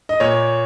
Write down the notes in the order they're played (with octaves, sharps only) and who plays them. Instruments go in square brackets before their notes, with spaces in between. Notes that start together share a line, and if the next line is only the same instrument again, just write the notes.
[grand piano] D#5
[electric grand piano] A#2 [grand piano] C#5